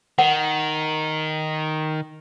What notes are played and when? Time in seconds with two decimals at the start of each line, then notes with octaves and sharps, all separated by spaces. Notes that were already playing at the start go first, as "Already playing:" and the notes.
0.19 D#3 F#5